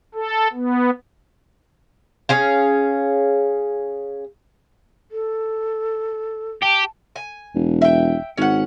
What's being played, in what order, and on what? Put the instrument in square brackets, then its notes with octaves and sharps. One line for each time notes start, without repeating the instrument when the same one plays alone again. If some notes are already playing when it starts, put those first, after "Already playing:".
[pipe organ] A4
B3
[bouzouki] C#4 G#4 F5
[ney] A4
[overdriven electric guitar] G4 [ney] A5
[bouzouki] G#5
[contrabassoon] E1
[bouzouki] E5 G5
[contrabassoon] G#1 [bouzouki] C#4 F#5